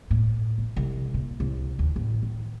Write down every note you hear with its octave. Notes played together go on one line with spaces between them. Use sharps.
A2
A#1
C2
A#2
C2
D#2
A1
D#3